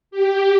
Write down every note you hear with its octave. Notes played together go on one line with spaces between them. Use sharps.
G4